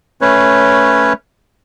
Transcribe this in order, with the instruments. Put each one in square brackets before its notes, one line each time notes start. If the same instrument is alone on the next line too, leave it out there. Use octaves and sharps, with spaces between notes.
[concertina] A3 C#4 B4 C#5